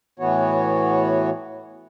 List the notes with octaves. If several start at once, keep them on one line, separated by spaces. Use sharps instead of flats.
A2 E3 B3 F#4 C#5